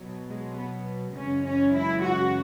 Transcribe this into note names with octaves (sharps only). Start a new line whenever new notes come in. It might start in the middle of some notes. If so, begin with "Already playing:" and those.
Already playing: B2 F#3
G#3
B3
F#2 C#3 E3 G#3 C#4
C#4
E4
F#4